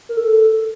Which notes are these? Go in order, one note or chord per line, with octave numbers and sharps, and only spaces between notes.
A#4
A4